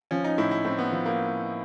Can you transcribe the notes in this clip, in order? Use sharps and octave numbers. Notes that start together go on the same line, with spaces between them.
F3 C#4
D#4
A2 E4
E4
A2 C4
B3
F3
A#3